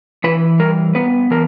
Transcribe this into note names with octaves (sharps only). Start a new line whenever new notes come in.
E3 B4
G3 A#4
B3 B4
E3 A#4